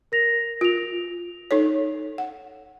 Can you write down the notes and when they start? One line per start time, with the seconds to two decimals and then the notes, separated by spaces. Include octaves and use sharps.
0.12 A#4 A#6 F7
0.61 F4 D7 F7
1.51 D#4 A4 C#5
2.18 F#5